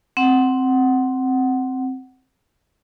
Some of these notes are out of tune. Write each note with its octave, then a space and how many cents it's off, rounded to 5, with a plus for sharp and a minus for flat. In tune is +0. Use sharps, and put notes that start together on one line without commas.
C4 +0 F#5 +10